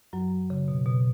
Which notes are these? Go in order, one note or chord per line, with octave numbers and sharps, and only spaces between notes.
F#2 F#3
C#3
B2
B2